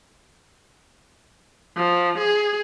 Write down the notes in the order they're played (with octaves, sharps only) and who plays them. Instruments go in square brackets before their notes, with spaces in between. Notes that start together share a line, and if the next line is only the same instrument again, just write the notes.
[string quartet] F3
G#4